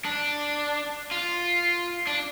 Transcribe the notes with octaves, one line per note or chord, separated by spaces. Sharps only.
D4
F4
D4